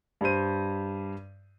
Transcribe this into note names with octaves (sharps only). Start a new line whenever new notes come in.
G2 G3 D4 C5 D#7